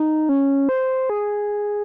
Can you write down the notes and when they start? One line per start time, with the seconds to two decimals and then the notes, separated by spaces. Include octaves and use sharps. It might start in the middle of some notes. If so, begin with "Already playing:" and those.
Already playing: D#4
0.29 C#4
0.69 C5
1.10 G#4